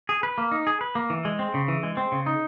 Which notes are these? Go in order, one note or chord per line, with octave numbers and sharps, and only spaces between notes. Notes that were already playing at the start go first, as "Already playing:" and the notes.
G#4
B4
A#3
D#4
G#4
B4
A#3
E3
G#3
C4
C#3
E3
G#3
C4
C#3
D#4